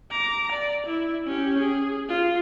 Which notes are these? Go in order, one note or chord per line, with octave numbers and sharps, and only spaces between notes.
A#5 D6
D5
E4
C#4 G4
G#4
F4